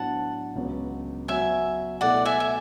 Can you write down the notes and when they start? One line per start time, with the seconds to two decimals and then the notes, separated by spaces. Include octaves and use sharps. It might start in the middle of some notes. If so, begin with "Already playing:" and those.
Already playing: A2 F#3 B3 D4 F#5 A5
0.55 C#2 C#3 F#3 B3
1.28 F#3 B3 F#4 E5 G#5
2.01 B2 A3 E4 A4 D5 F#5
2.25 E5 G#5
2.40 E5